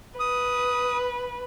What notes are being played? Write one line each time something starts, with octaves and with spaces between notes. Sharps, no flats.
B4 D#6